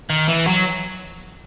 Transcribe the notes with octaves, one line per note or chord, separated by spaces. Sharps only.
D#3
E3
F#3